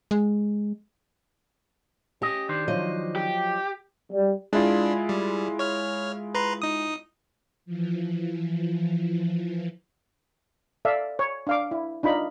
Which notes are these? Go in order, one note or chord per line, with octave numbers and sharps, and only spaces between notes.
G#3
C#4 G4 D#5
D#3 D4 C5
F3 F#3 D#5
G4
G3
G#3 D4 E4 F4
G3
C#5 F6
B4 A#5 C6
D#4 D#6
E3 F3
A4 D5 E5 F5
C#5
D4 F5 D6
E4
D4 D#4 F4 B5